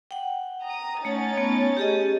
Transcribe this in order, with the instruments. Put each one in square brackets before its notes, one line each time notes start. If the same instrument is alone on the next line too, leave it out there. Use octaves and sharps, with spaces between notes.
[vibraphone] F#5 G5
[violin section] A#5 D#6
[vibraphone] A3 F#5 [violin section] C#4 D#4 A6
[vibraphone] A3 B3
G4 G#4 D#5